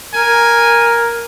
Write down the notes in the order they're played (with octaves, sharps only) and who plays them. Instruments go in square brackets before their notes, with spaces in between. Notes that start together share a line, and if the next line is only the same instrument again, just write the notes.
[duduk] A#4 [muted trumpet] G#5